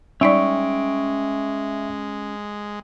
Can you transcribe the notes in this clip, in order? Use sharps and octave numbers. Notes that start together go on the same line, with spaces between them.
G3 G#3 C#4 D#4 D5 E5 G5 C#6